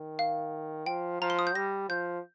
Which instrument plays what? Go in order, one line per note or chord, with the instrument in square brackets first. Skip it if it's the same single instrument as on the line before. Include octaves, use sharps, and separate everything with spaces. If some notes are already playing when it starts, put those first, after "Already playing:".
Already playing: [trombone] D#3
[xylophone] F5
[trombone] F3 [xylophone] G5
[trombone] F3 [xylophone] A#5
[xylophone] C6
D#6
G6
[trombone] G3 [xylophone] A#6
[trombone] F3 [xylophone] G6